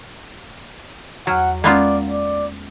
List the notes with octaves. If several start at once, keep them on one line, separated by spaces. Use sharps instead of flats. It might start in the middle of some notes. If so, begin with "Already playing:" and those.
E2 F#3 F#5 F6 G#6
G#3 A#3 B3 C#4 F4 D5
D5